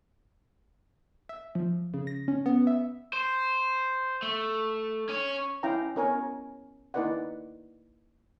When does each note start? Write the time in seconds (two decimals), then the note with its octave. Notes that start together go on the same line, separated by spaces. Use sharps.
1.29 E5
1.55 F3
1.94 C#3
2.07 A#6
2.28 C#4
2.46 B3
2.67 E5
3.13 C5
4.22 A3
5.09 C#4 C#5
5.63 C#4 E4 F5 G5 A#5
5.95 B3 C#4 A#4 C#5 G#5
6.94 A#3 D#4 E4 B4 D5 F#5